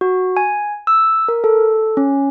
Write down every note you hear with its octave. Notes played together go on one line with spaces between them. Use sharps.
F#4
G#5
E6
A#4
A4
C#4